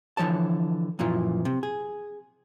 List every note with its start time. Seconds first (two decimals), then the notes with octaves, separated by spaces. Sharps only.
0.17 D3 E3 F3 C#5 A5
0.99 F#2 A#2 E3 F3
1.45 C3
1.63 G#4